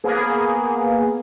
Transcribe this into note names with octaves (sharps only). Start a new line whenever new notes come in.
A#3 B3 G#4